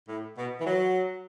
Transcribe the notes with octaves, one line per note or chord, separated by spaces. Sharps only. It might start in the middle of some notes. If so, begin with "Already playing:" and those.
A2
B2
E3
F#3